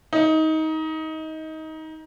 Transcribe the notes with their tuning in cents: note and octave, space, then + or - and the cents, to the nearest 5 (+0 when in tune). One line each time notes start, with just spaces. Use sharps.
D#4 +20